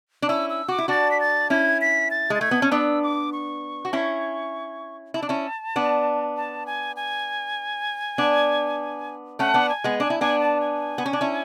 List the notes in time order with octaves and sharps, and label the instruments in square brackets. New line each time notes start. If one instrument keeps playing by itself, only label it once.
[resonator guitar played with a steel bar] D4
[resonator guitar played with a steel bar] C#4 E4 [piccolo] E6
[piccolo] E6
[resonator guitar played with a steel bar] F#4 [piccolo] D6
[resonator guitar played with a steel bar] E4
[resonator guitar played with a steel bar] D4 F#4 [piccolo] A6
[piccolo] B6
A6
[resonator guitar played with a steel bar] C#4 E4 [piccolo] G#6
[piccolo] B6
A6
[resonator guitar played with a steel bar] G#3 [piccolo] A6
[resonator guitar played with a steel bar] A3 [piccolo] G#6
[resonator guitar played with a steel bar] B3
C#4
[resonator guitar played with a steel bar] B3 D4 [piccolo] E6
[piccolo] D6
C#6
[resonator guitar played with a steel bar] F#4
C#4 E4
[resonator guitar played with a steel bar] E4 [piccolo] A5
[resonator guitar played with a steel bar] D4
C#4 E4
B3 D4
[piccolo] A5
G#5
G#5
[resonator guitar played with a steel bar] B3 D4
[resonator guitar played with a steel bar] A3 C#4 [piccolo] F#5
[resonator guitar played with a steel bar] B3 D4
[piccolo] G#5
[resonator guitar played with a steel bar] G#3 B3
[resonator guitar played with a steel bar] D4 [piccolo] G#5
[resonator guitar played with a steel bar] E4
[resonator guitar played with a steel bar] B3 D4 [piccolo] G#5
[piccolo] A5
G#5
[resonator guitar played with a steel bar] B3
C#4
D4
C#4 E4